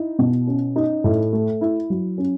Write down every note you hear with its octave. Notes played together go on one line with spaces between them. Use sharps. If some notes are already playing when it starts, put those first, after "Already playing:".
Already playing: D#4 E4
B2
C#4
D#4
A2
A3
E4
F#3
C#4